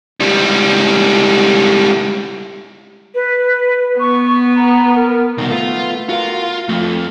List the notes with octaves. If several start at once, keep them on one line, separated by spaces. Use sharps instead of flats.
C#2 G3
B4
B3 C#6
A#5
A#4
C2 B2 D#3
A3 B3 F4
F4 F#4 A#4 F5
F2 A3 F4